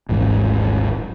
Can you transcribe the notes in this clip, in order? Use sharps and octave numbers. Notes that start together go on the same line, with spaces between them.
D#1 G#1 G#2 E3